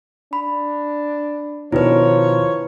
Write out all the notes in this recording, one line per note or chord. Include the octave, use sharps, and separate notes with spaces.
D4 B5
B2 D#3 F3 D4 E4 B4 C#5